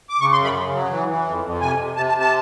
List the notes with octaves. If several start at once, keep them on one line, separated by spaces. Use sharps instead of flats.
D6
C#3 C#6
C6
F#2
B5
C#3
F#3
E3
E3
F2
F2
C3 G#5
C3
C3 A5
A5
C3
A5